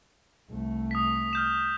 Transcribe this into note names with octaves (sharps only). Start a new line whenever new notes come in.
C2 A3
D#6 B6
F6 G6 E7